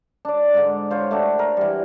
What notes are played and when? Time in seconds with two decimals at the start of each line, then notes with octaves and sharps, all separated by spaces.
0.25 D4 D5
0.54 G#2 D3
0.91 F4 C5 C#5
1.11 A3 D4 F#4
1.39 A#4
1.57 E3 G3